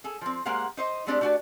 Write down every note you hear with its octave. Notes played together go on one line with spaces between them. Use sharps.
G#4 A4
F3 C4
G#3 A#3 G4 C5 F5 F#5
D#4 C5 D#5
G#3 A3 C4 D4 G4 A4
A3 D4 F#4 D5 A5